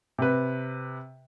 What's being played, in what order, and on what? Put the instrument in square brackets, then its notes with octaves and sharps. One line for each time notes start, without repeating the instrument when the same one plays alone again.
[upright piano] C3 B4